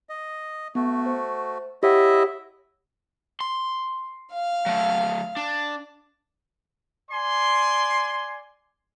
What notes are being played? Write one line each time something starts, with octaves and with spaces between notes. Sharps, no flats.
D#5
A3 B3 F#4
C5
E4 G4 C#5 D#5 E5 F#5
C6
F5
F#3 A3
D4
D5 G#5 C6